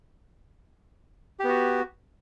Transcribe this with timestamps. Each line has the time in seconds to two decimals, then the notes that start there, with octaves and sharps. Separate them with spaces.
1.40 G4
1.44 B3
1.49 F#4